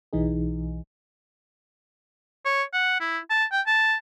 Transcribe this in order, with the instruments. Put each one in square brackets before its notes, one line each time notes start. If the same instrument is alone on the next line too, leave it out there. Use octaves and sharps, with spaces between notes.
[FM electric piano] B1 E3 D#4 G#4
[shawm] C#5
F#5
E4
A5
G5
A5